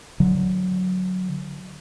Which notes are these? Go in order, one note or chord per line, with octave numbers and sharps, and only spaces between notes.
D3 F#3